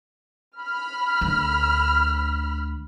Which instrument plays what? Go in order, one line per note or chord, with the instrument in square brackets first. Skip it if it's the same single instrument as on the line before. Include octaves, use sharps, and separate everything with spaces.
[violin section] B5 F6
[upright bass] D2